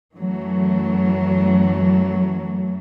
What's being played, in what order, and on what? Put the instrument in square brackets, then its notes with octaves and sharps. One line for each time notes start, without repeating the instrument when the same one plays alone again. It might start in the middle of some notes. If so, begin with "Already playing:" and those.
[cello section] F#2 E3 F#3 A3